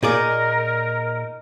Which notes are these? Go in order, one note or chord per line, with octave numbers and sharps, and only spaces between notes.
A#2 D#4 G#4 A#4 D5